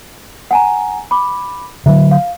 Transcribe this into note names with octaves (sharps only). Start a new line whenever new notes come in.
F#5 G#5 A#5
B5 D6
D3 F#3 E5
F5